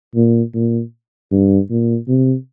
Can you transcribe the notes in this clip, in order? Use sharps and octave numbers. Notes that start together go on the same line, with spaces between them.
A#2
A#2
G2
A#2
C3